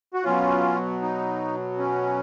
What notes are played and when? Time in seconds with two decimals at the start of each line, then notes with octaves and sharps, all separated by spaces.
0.14 F#4
0.24 B2 F#3 C#4 F4
1.02 D#4
1.78 C#4